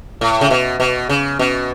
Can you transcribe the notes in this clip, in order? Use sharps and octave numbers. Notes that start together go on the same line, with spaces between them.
A2
C#3
B2
B2
C#3
B2